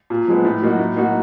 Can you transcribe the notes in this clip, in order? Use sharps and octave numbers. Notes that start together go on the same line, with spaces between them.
A#2
F3 G#3 B3
A2
F#3 A#3 D#4 F#4
A2
F#3 A#3 D#4 F#4